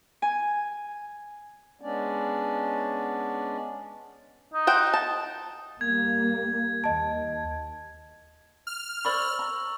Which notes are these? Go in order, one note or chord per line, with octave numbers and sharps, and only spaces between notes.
G#5
G#3 B3 C#4 D4 D5
D#4
C5 F#5 G5
A5
G3 A#3 G#6
D#2 D#5 A5
F6
C5 D5 B5 C#6 E6 F#7
A#5